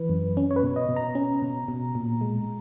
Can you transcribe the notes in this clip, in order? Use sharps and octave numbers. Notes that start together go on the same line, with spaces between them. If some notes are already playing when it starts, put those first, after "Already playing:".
Already playing: E3 B4
F#2
C#4
C#5
B4
B2
D#5
B2
A#5
C#4
B2
B2
A#2
G#3